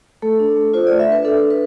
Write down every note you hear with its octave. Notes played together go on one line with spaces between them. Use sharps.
A3 A4
D4
A3
F4 C5
A3 D5
E5
D4 B4
D4 A4
D4
B4